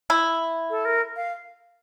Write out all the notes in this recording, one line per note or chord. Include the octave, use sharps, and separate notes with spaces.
E4
A4
A#4
F5